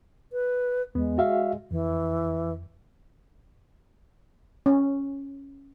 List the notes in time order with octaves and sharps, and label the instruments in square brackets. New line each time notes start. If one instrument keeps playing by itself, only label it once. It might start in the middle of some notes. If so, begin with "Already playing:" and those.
[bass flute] B4
[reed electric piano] E2 B3 [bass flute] G#3
[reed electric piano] F#4 E5 F5
[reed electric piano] F2 [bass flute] E3
[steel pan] C#4